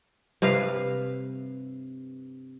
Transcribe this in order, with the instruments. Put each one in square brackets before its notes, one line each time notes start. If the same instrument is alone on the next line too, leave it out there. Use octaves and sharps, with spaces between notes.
[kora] G2 C3 B4 F5